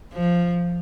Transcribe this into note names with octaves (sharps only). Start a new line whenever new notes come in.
F3